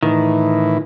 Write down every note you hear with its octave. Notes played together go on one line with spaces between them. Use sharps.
A2 D#3 E3